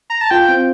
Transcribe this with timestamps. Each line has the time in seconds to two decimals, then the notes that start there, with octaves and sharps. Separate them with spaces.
0.10 A#5
0.21 A5
0.31 F4 G5
0.48 C4